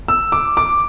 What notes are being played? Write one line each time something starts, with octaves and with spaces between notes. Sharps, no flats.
E6
D6
D6